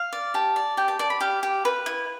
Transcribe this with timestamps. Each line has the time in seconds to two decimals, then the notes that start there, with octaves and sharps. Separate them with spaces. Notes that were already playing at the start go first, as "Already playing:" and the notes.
Already playing: F5
0.13 D5
0.34 G4 A5
0.56 D5
0.77 G4 G5
0.88 A5
0.99 D5 A5
1.10 B5
1.21 G4 F5
1.43 G4
1.65 B4
1.86 E4